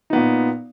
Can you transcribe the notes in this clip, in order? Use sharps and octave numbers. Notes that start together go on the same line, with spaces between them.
A#2 B3 D#4